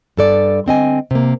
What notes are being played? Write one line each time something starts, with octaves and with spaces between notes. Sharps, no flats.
G2 A4 D5
D3 C4 D#5 G#5
C3 A#3